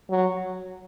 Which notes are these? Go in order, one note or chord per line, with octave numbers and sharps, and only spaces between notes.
F#3